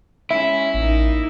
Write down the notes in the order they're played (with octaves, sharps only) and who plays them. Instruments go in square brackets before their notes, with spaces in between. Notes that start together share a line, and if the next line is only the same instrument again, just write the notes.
[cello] G#3 C#4 [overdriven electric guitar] E4 [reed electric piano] E5
[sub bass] A1 [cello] A#3 D#4